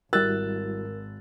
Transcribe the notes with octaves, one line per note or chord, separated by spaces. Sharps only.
G#1 G3 E4 F#4 A#4 E6 F#6 A6